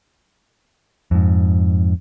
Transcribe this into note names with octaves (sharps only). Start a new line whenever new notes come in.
F2 G#2